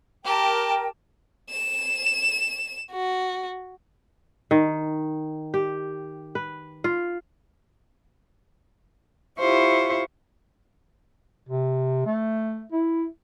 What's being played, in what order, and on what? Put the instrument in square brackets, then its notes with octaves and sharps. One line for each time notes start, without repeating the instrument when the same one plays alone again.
[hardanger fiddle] G4 A5 [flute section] A#4 G5
[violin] E7
F#4
[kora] D#3
G4
B4
F4
[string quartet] E4 F4 G4 C5 C#6
[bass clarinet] C3
A3
E4